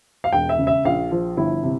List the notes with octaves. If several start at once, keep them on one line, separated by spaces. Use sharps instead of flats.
F5
E1 G5
E5
C#3
E5
A#1 F5
F3
G1 E4
C3